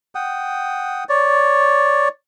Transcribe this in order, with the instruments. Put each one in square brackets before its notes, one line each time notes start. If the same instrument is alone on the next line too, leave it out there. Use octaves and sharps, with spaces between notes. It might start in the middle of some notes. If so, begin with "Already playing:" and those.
[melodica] F#5 G5 D#6
C#5 D5